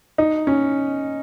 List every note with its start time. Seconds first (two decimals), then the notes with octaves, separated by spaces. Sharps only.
0.18 D#4
0.47 C#4